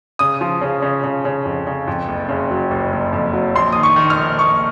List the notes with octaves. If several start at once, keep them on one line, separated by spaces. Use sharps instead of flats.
C#3 D#6
F3
C#3
C#3
C#3
C#3
F2
C#3
F2
F#1
C#3
F#3
F#1
F#1
F2
F#3
A#1 C6
D#3 D#6
C#6
D#3
F6
A#1
A#1 C#6